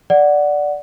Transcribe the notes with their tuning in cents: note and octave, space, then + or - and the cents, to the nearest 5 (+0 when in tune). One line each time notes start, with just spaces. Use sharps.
D5 +0 F#5 +0